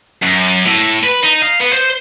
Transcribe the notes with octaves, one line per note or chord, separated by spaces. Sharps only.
F#2
A2
B4
D#4
F5
B3
C5